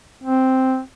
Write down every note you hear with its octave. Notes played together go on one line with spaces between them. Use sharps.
C4